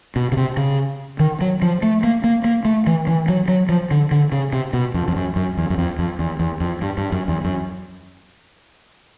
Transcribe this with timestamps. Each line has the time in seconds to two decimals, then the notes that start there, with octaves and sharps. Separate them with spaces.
0.16 B2
0.32 C#3
0.37 C3
0.57 C#3
1.19 D#3
1.41 F#3
1.62 F3
1.83 A3
2.04 A#3
2.24 A#3
2.44 A#3
2.65 A3
2.87 E3
3.07 E3
3.28 F#3
3.48 F#3
3.69 F3
3.91 D3
4.11 D3
4.32 C#3
4.53 C3
4.73 B2
4.94 F2
5.08 F2
5.16 F#2
5.36 F#2
5.57 E2
5.70 F#2
5.78 F2
5.99 F2
6.19 E2
6.39 E2
6.60 F2
6.82 G2
6.98 G2
7.12 F#2
7.28 E2
7.44 F#2